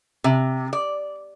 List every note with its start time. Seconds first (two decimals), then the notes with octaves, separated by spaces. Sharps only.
0.24 C3
0.73 D5